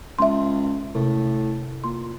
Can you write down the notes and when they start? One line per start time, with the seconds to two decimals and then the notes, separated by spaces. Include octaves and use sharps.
0.19 C#2 E5 C6
0.95 A2 C3
1.84 A#2 C6